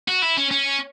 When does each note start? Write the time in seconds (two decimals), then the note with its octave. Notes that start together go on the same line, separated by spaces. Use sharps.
0.08 F#4
0.22 E4
0.37 C#4
0.51 C#4